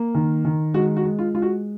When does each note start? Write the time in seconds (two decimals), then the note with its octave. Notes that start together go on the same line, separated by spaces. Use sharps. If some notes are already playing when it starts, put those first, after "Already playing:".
Already playing: A#3
0.15 D#3
0.45 D#3
0.74 G#3 F#4
0.97 F#4
1.05 G#3
1.19 F4
1.34 G#3 F4
1.42 F#4